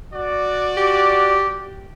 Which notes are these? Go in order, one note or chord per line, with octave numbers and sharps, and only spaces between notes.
F#4 D5
G4